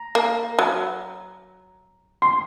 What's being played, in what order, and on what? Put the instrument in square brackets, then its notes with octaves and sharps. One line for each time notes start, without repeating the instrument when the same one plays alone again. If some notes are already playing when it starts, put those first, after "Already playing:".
Already playing: [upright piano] A#5
[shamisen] A#3
F#3
[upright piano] C6